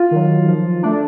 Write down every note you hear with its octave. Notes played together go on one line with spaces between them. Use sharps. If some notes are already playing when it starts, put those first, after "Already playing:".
Already playing: F4
D#3 F#3
F3
A3 D4